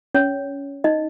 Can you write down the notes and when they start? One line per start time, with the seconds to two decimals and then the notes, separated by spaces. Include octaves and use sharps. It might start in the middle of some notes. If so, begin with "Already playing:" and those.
0.14 C#4 C#5
0.84 D#4 D#5